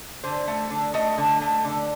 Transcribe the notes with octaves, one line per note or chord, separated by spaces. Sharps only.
D3 C5
A3
D3
A3 D#5
D3
A3
D3